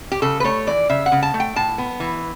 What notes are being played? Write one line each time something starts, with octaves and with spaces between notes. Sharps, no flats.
G4
C#3 A4
B4
A3 C#5
E3 D5
C#3 E5
F#5
C#3
A5
A3
G5
A2 A5
B3
E3